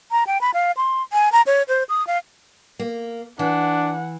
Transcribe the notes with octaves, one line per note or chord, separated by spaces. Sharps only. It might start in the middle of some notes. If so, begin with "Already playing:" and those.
A#5
G5
B5
F5
C6
G#5
A#5
C#5
C5
D#6
F5
A#3
E3 D4 F#5